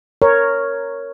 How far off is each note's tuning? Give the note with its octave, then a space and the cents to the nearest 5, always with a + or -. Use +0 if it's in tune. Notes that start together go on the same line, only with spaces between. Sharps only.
A#4 -5 C#5 +0